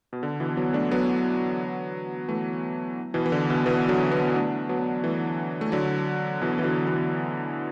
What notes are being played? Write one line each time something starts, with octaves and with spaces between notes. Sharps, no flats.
B2
D3
B2 E3
F#3 B3
A3 D4
F#3 B3
E3 A3
B2 E3
E3
D3
B2
B2 E3
D3 F#3
F#3 B3
A3 D4
F#3 B3
E3 A3
A3
D3 F#3
B2 E3
E3
D3 F#3
B2 E3